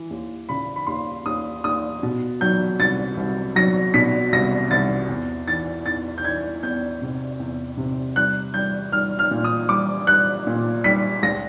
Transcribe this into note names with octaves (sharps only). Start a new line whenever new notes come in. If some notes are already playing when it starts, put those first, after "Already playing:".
Already playing: E3
D#2
C#3 B5
B5
D#2 C6
D#2 D#6
D#2 D#6
B2
F#3 G6
C2 A6
C2
F#3 A#6
B2 B6
C2 A#6
C2 A6
E2
E3 A6
E2 A6
G6
E3 G#6
E2 G6
C3
E2
C3
G3 F#6
G3 G6
G3 F6
F6
A#2
D#6
G3 D6
G3 F#6
A#2
G3 B6
C#2 A#6